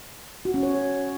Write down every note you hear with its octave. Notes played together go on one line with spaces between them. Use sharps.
F#4
C#4
C#5